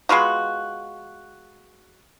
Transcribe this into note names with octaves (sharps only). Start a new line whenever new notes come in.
G#3 B3 F4 F#4